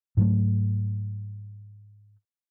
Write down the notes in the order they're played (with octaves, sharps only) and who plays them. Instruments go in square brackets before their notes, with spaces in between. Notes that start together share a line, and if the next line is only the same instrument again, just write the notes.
[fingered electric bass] G#2 F#3 A3